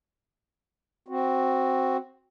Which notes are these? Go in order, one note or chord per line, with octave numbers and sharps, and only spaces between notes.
C4 F#4